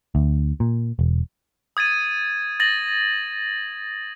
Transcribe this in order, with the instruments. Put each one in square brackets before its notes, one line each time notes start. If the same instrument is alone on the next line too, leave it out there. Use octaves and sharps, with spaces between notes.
[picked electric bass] D2
A#2
E1
[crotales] D#6 G#6 A6 D#7
A6 A#6 F#7